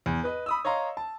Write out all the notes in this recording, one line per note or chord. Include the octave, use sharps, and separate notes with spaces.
E2
B4 D#5
B5 D#6 E6
C#5 D#5 F5 A#5 C6
A5